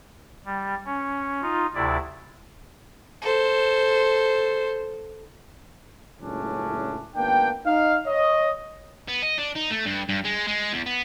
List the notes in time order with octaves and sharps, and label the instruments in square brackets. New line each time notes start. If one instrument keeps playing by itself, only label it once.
[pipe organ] G3
C#4
D#4 F4
D2 C3 E4 D5
[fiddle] A4 C5
[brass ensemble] F#1 C#2 A2 C#4 D4
G#1 A#3 B3 D4 G5
D#4 F5
C#5 D#5
[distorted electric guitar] B3
D#5
D4
D#4
A3
G2
G2
G#3
G#3
E2
B3